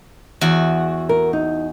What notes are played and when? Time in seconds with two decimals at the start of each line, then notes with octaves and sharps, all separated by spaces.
0.41 E2 F#4
1.09 A#4
1.33 D#4